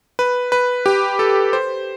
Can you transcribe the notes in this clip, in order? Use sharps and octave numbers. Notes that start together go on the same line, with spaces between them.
B4
B4
G4
A4
C5